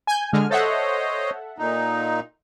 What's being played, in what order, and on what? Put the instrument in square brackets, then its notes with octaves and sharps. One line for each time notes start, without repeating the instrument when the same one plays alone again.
[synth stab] G#5 G6
[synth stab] D3 G#3 [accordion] G#5 F6
[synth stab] A4 E5 F#5 [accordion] C5 C#5 D#5
[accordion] A#2 D#4